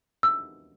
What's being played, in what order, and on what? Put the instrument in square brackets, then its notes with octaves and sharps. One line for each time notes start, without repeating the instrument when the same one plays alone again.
[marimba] E6